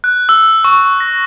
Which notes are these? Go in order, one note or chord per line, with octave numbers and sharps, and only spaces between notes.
F#6
E6
C#6
A#6